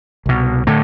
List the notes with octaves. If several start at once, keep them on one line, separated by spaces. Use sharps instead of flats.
C2 B2
A2 D3 A3